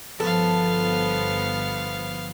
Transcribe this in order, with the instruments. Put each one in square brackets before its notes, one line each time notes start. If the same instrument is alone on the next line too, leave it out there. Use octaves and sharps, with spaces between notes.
[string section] G1 F3 [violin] B3 F5 [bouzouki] A4